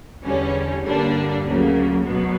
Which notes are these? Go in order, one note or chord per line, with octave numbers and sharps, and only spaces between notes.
E2 D3 G3 C#4
G2 D3 G3 A#3 D4
D2 C#3 F#3 A#3
B2 F#3 B3